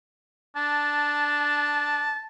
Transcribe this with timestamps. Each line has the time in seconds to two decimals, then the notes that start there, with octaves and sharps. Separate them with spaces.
0.56 D4 A5